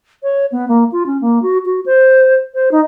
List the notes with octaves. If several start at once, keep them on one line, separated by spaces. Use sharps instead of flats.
C#5
B3
A#3
F4
C#4
A#3
F#4
F#4
C5
C5
D#4